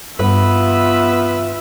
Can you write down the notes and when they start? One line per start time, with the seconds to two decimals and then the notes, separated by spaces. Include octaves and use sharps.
0.19 G2 B3 F4 B4 E5